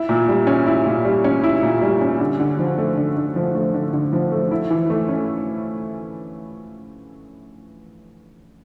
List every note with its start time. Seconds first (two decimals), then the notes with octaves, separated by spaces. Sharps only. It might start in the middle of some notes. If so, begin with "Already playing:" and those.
Already playing: E4
0.09 A#2
0.28 G3
0.47 C#4
0.66 E4
0.86 A#2
1.05 G3
1.24 C#4
1.44 E4
1.63 A#2
1.82 G3
2.01 C#4
2.20 D3
2.40 D3
2.59 F3
2.78 A3
2.97 D3
3.17 D3
3.36 F3
3.55 A3
3.74 D3
3.93 D3
4.13 F3
4.32 A3
4.51 E4
4.71 E3
4.90 A3
5.09 C#4